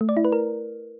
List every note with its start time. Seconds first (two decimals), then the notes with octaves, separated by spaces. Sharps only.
0.01 A3
0.09 D5
0.17 E4
0.25 B4
0.32 A#4